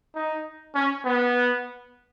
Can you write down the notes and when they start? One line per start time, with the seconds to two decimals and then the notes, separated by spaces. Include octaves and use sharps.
0.15 D#4
0.75 C#4
1.05 B3